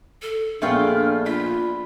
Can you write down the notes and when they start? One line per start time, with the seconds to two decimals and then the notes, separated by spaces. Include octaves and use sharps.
0.22 A4
0.62 A#1 A3 B3 D4 F4 G#4 G5 F6
1.26 F4 B5